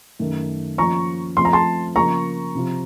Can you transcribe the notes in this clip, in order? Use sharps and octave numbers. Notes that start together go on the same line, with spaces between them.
F#2 D#3 A3
F3 A#3 C#4 F4 A#5 C#6
F3 A3 C4 F4 C6
A#5
A5 C6
C#3 F3 A#3 F4 A#5 C#6
C3 F3 C4 F4